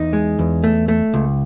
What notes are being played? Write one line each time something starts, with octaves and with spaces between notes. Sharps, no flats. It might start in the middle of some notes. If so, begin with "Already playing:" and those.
Already playing: E2 D#4
G#3
E2
A3
A3
C#2